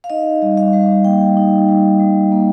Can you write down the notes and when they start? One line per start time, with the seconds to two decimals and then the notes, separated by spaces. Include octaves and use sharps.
0.04 F5
0.10 D#4 D#5
0.42 G3
0.58 F5
0.73 G3
1.05 A#3 G5
1.37 D#4
1.69 G3
2.00 G3
2.32 A#3